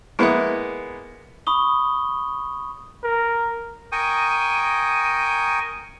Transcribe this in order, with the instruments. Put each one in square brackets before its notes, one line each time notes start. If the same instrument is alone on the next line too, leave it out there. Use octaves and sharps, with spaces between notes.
[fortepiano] G#3 A#3 B3 [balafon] E4 E5
[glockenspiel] B5 C#6 D#6 G7
[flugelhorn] A#4
[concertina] A#4 G5 G#5 C#6 D#6